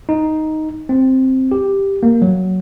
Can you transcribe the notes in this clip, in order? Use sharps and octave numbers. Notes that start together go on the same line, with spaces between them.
D#4
C4
G4
A#3
F#3